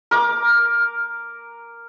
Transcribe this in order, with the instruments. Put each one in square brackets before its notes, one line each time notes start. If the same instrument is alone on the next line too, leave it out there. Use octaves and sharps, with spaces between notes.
[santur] A#4 D6